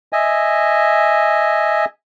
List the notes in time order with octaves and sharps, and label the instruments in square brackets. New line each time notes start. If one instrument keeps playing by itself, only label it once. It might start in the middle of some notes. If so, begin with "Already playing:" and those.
[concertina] D#5 E5 G#5